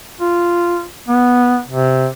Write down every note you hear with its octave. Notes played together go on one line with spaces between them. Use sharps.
F4
B3
C3